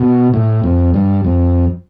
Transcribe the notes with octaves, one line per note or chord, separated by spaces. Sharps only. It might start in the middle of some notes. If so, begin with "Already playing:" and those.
Already playing: B2
A2
F2
G2
F2